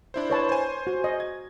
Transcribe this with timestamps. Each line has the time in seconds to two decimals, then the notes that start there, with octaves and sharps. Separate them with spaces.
0.14 D4 E4 C5
0.30 B4 C#5 A5
0.49 C5 G#5
0.87 F#4
1.04 D#5
1.20 G#6